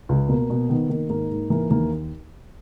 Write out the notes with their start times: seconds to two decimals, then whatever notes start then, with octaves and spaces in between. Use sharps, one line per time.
0.09 C#2
0.29 B2 A#3
0.50 B2
0.69 D#3 B3
0.89 D#3 A#3
1.09 G#2 A#3
1.31 G#2
1.50 E3 A#3
1.70 D#2 A#3